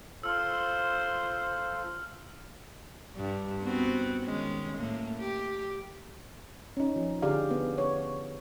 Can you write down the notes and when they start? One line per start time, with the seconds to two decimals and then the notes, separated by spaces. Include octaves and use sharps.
0.23 F4 A4 C5 E6 F6
3.16 G2
3.63 B3 C4 F#4
4.23 D#3 G#3 C#4
4.77 A2 A#3
5.18 G4
6.77 C#4 D#4
6.96 F3
7.22 D3 G4 G#4 D5 F5
7.51 B3
7.78 C#5